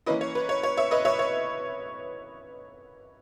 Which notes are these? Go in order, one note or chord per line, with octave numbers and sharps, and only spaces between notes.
E3 A#3 C#4 E4 B4 D#5
C#5
B4
C#5
C#5
C#5 E5
B4 D#5
C#5 E5
C#5